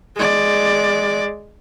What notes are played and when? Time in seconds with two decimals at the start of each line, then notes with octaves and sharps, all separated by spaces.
0.16 G#3 D5